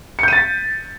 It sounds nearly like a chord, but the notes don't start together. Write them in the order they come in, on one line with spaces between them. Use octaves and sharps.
C#7 G6 D#7 A6 B6